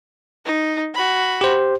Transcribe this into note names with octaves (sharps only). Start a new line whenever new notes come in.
D#4
F#4 B5
G4 C5